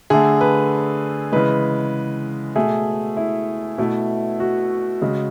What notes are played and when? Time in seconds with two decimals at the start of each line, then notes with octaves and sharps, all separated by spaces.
0.10 D3 A3 G#4
0.41 B4
1.32 C#3 E3 G#3 B4
2.56 B2 A3 G#4
3.17 E4
3.78 B2 A3 E4
4.40 F#4
5.02 C#3 G#3